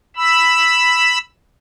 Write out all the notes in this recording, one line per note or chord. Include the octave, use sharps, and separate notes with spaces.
B5 E6